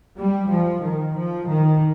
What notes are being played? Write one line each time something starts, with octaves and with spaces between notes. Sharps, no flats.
G3
F3
D#3
F3
D#3